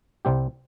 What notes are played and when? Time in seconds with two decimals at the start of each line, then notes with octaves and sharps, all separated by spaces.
0.25 C2 C3 G3 C4 G4